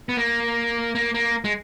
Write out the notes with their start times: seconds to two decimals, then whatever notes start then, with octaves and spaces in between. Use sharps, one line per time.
0.09 B3
0.17 A#3
0.95 A#3
1.14 A#3
1.44 G#3